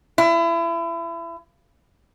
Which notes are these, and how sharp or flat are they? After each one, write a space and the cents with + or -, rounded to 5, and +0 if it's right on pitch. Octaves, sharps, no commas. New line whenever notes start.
E4 +30